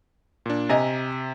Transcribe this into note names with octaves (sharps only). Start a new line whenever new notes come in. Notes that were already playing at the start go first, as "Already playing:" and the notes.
A#2 D4
C3 D#5 G#5 A#5